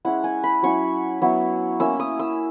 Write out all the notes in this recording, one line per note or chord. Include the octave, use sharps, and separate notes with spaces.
G#3 C#4 E4 F#5
G#5
B5
F#3 C#4 E4 C#6
F#3 B3 E4
A#3 C#4 E4 E6
D#6
E6